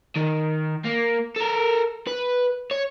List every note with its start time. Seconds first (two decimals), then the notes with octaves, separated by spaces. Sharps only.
0.16 D#3
0.85 A#3
1.36 A4 A#4
2.07 B4
2.71 C#5